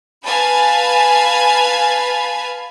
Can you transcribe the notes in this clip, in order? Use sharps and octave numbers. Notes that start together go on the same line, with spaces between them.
B4 F5 G#5 A5 B5